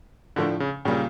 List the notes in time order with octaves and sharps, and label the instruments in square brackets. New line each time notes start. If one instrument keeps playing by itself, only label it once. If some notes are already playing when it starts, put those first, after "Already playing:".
[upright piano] A2 F3 A3 D4 [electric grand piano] D3
[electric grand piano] C#3
[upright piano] A#2 G3 A#3 [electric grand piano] C#3